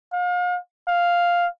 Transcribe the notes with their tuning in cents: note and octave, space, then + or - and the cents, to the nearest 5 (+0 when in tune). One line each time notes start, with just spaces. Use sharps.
F5 +40
F5 +0